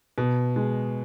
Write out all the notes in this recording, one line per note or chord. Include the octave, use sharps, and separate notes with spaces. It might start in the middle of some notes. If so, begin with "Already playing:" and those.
B2
G#3